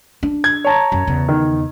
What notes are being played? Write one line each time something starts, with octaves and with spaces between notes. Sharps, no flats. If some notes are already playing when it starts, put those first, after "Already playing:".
D4
G#6
C#5 A5 A#5
F#2
E2 C#3
D#3